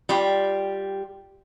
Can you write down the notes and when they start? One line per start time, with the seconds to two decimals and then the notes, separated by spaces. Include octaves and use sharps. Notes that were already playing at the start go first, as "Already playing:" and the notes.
0.09 G3 F4 G4